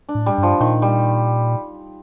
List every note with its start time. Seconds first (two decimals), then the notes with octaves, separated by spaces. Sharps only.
0.09 D4
0.15 A2
0.26 G3
0.38 G2 F3
0.60 A#2 D#3
0.82 G3